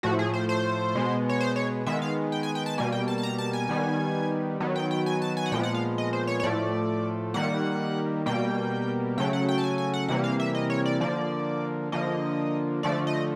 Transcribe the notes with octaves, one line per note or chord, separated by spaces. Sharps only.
A2 F3 A3 F#4
G#4
C5
C5
B2 G#3 B3
C#5
C5
C#5
D#3 G#3 B3 E5
F5
G5
G#5
G5
A5
B2 G3 A#3 G#5
G5
A5
A5
A#5
A5
G#5
D#3 G3 B3
D#3 F#3 B3
G5
G5
G#5
A5
G#5
F#5
A#2 F3 G#3 B3 G5
F#5
F5
D#5
C5
C#5
C#5
A2 F3 A3 D5
D#3 G3 A#3 F#5
B2 G3 A#3 G5
C#3 F#3 A3 G5
F#5
G5
A5
G#5
G#5
F#5
C3 E3 G3 A#3 F#5
F5
E5
D#5
C#5
D5
D3 F3 A#3 D5
D3 F3 A#3 D#5
D3 F3 A3 D5
D#5